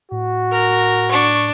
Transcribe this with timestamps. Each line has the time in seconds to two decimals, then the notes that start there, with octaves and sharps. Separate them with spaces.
0.12 A2 F#4
0.52 A#4
1.11 D4 C#6